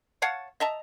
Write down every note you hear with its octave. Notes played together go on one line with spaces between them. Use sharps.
C#5 F5 F#5 A5
D#5 E5 A5 A#5